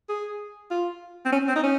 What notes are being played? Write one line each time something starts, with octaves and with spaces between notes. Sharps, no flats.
G#4
F4
C4
C#4
C4
D#4
C#4